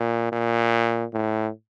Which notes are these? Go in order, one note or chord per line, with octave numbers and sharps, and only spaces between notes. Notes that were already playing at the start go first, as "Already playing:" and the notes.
Already playing: A#2
A#2
A2